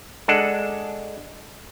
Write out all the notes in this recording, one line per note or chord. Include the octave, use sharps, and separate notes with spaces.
G#3 D4 A4 F#5